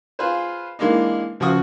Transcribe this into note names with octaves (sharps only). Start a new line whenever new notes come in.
F4 G#4 B4 C5
E3 G#3 A#3 D4 D#4
C#2 F3 F#4 F#5 C#6 D#6